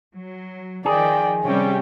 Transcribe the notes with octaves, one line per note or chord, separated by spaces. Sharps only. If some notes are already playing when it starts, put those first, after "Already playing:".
F#3
D#3 F3 G#4 D5 G5
C3 G3 C#4 G5